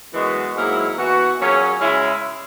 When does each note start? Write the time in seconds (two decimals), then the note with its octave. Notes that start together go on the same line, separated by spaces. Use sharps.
0.13 F#2 E3 G#3 B3 F#4
0.55 G#2 F#3 A#3 E4 G#4
0.96 E3 B3 F#4
1.38 A#2 F#3 C#4 G#4
1.80 C#3 G#3 C#4 E4